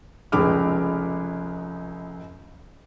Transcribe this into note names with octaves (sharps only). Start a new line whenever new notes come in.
F1 C#2 G#4 D6 F6